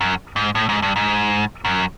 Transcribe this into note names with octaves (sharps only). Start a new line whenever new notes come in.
F#2
G#2
A2
G#2
G2
G#2
F#2